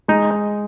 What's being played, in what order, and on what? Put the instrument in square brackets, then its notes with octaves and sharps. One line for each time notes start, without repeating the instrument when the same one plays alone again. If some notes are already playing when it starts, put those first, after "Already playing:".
[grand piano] G#3 [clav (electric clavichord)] D#4